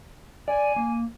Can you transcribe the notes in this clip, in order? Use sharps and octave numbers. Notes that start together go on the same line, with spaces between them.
D5 G#5
A#3